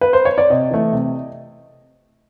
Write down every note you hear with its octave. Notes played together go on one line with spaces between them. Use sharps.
B4
C5
C#5
D5
C3 D#5
E3 A3
C3